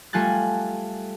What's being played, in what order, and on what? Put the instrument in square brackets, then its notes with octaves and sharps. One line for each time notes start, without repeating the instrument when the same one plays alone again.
[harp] G3 A3 F4 G#5 F#6 A6